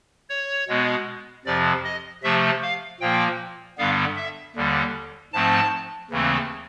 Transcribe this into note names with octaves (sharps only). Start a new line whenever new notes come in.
C#5
B2 G#3 B3
F2 C3 F3 D5
D#5
C3 F3 A3 E5
F5
A#2 F3 A#3 G5
G2 D3 G3 B3 F5
E5
D#2 D3 G3
G#2 F3 A3 C4 A5
D#2 C#3 E3 A3 C4